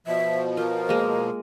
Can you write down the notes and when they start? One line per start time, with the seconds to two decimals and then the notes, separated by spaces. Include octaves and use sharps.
0.07 B2 F3 E5
0.57 F4 A#4
0.89 G#3 A#3